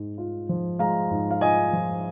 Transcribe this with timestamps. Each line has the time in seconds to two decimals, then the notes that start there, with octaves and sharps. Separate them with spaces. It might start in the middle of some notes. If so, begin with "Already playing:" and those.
Already playing: G#2 G#3
0.18 F4
0.49 F3
0.79 G#3 F5 A#5
1.11 G#2
1.31 F5
1.41 F4 D#5 G#5
1.73 F3